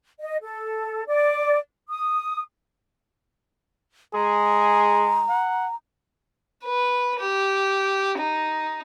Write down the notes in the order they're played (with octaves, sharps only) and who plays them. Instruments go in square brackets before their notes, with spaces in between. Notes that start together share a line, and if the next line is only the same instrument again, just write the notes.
[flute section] D#5
A4
D5
D#6
[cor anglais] G#3 [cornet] G#4 [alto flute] A#5
[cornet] F#5
[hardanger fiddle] B4
G4
D#4